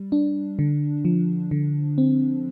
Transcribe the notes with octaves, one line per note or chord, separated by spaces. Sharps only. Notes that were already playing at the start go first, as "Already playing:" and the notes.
Already playing: G3
D4
D3
F3
D3
C4